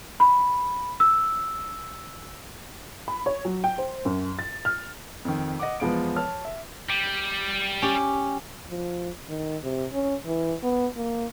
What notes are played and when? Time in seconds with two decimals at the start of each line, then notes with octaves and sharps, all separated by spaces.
0.20 B5
1.00 E6
3.08 B5
3.26 C#5
3.45 F#3
3.64 G5
3.78 C5
4.05 F#2
4.39 A6
4.65 F6
5.25 F2 D#3
5.60 D#5 F#5 D6
5.80 E2 F3 G#3 B3 F5 D7
6.16 C#5 A5 F6
6.45 E5
6.89 G3
7.82 C#4 G4 G5
8.70 F3
9.29 D#3
9.64 C3
9.93 C#4
10.26 E3
10.63 B3
10.97 A#3